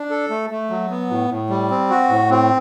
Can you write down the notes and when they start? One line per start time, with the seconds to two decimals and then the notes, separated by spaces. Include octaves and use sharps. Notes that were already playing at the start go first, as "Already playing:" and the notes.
Already playing: D4
0.10 A4
0.30 A3
0.50 A3
0.70 F#3
0.90 B3
1.10 A2
1.30 A2
1.50 G3
1.70 C4
1.90 F#4
2.10 A2
2.30 C4